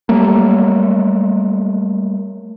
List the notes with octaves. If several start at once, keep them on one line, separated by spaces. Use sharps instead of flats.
F#3 G3 A3 A#3